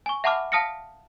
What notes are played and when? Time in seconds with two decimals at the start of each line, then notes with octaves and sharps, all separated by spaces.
0.06 G#5 C#6
0.24 E5 F#5 A5 B5 D6 F6
0.52 F5 A5 D#6 F6 A#6 C#7